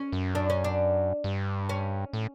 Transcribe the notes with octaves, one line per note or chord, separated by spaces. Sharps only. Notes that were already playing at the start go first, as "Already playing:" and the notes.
Already playing: C#4
F#2
D4
C#4
D4
G2
C#4
A2